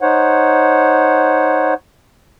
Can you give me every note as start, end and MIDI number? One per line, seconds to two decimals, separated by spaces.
0.01 1.74 63
0.01 1.74 72
0.01 1.74 73
0.01 1.74 78